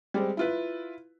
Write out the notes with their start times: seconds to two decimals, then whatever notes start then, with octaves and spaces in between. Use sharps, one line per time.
0.14 G3 G#3 C4
0.37 E4 F4 B4